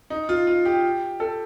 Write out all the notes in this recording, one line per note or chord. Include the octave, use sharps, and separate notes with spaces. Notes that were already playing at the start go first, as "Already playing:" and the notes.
D#4
F4
F4
G4
A4